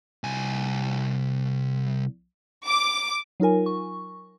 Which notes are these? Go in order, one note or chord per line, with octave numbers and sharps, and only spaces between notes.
C2 G#5
D6
F#3 D#4 F4 A#4 G#5
C#6